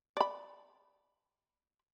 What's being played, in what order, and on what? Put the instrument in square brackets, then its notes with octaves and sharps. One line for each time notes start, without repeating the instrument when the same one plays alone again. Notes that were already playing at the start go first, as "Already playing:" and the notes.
[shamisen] D5 B5